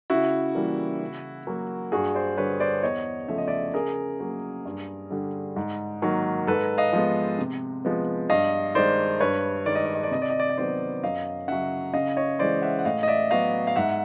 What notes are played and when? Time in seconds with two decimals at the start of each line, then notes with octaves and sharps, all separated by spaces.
0.10 C#3 E4 F#4
0.55 E3 G3 A#3
1.01 C#3
1.47 F#3 A#3
1.92 G2 F#4 G#4
2.14 C5 D5
2.37 D3 G3 B4 C#5
2.60 C5 D5
2.83 E2 C#5 D#5
3.28 C#3 F3 A3 E5
3.38 D#5
3.48 D5 E5
3.74 C#3 G#4 A#4
4.20 F#3 A#3
4.65 G2
5.10 D3 G3
5.56 G#2
6.02 D#3 F#3 A#3
6.47 G#2 A4 B4
6.78 D#5 F5
6.93 F3 G#3 B3
7.39 C3
7.85 F3 G#3 B3
8.30 G2 D#5 F5
8.75 D#3 G#3 C5 D5
9.20 G2 B4 C#5
9.66 D#3 G#3 D5
9.75 D#5
9.84 D5
9.94 D#5
10.03 D5
10.11 C3 D#5
10.22 D5
10.30 D#5
10.40 D5
10.49 D#5
10.57 D#3 F#3 B3 C5 D5
11.03 F#2 D#5 F5
11.48 C#3 F#3 E5 F#5
11.94 C#3 D#5 F5
12.17 C#5 D#5
12.39 E3 G#3 C5 D5
12.62 E5 F#5
12.79 F#5
12.85 A2 D#5 F5
13.03 D#5
13.08 D5 E5
13.31 F#3 B3 D#5 F5
13.67 F5
13.76 G#2 E5 F#5